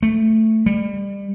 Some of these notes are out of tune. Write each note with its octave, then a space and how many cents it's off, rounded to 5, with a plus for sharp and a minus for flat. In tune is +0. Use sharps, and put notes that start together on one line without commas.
A3 +5
G3 +30